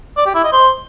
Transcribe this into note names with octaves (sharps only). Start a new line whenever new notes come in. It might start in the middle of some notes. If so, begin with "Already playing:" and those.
D5
G4
E4
D#5
C5